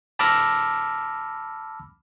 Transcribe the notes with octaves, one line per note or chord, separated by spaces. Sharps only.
A5 B5 D6 E6 F6 A#6